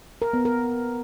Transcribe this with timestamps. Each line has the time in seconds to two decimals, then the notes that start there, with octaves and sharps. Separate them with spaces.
0.22 A#4
0.33 B3
0.45 A#4